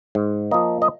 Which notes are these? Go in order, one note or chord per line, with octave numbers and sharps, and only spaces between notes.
G#2
F3 A#3 D#5
D#5